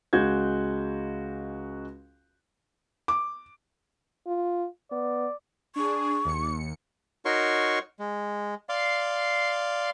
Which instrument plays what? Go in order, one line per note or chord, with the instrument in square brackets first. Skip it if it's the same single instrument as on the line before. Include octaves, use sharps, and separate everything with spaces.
[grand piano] C#2 G#3 F#4 G6 G#6
[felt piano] D6
[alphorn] F4
[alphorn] B3 [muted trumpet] D5
[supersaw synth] D4 G#4 [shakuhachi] C#6
[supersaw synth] D#2 C#7
[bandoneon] D#4 F#4 A#4 C#5 C6 C#6
G#3
D5 F5 C6